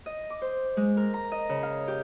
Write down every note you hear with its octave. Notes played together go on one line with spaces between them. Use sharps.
D#5
D6
C5
G#3
A#4
A#5
D#5
C#3
F5
G4